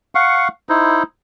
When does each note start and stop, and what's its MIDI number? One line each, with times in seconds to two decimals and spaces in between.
0.15 0.48 77
0.15 0.48 78
0.15 0.48 85
0.69 1.03 63
0.69 1.03 64
0.69 1.03 72